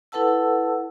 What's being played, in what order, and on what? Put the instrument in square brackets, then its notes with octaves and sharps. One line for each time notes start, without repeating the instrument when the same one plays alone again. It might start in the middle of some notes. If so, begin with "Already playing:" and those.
[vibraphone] E4 A4 B4 F#5 A5 E6